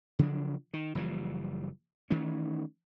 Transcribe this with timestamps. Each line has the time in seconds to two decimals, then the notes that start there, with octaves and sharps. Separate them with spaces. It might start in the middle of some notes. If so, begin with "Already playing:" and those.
0.19 C#3 F3 F#3 D4
0.73 D#3
0.95 F#1 E3 F3 G3
2.10 D#3 E3 A3 C#4